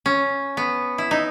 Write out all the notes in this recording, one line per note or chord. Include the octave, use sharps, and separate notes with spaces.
C#4
B3
E4
D#4